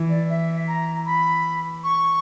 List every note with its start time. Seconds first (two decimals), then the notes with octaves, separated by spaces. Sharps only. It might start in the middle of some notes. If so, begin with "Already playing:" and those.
Already playing: E3
0.09 D5
0.29 E5
0.68 A#5
1.06 B5
1.84 C#6